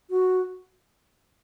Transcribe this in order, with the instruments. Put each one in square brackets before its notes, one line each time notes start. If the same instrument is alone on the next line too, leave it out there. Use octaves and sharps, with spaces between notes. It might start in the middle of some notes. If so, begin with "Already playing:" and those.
[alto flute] F#4